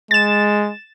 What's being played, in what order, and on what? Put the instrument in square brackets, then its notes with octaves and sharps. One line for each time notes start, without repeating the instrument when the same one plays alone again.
[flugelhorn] G#3 [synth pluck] A6 E7